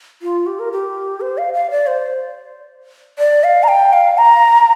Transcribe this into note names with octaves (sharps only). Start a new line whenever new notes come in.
F4
G4
A#4
G4
C5
F5
F5
D5
C5
D5
F5
A#5
G5
F5
A#5